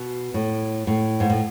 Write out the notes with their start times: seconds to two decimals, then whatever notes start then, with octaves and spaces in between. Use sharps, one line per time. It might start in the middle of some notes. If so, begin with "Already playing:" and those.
Already playing: B2
0.34 A2
0.87 A2
1.20 G#2
1.30 A2